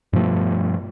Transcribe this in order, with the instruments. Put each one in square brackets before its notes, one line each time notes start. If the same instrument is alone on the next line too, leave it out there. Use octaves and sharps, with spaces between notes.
[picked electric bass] G2 B2 F3 A3